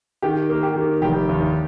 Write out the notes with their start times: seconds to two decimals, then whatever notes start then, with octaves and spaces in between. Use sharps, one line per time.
0.22 D#3 G4
0.49 A#3
0.63 G4
0.76 D#3
1.02 F1 G4
1.29 D#2